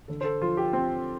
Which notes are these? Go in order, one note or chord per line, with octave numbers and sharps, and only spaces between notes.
D3 A4
C5
A4
F3 F4
G4
C4